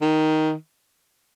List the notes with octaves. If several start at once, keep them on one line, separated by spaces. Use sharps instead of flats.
D#3